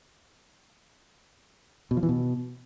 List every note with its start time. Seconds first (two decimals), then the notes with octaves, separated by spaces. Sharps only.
1.91 B2
1.97 F3
2.03 E3
2.09 B2